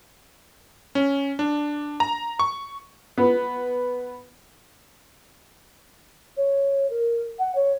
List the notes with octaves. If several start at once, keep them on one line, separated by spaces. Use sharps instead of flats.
C#4
D4
A#5
C#6
B3
C#5
A#4
F#5
C#5